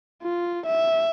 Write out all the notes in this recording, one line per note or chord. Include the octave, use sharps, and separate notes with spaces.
F4
E5